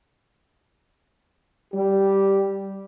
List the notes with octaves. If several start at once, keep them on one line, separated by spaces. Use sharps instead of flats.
G3 G4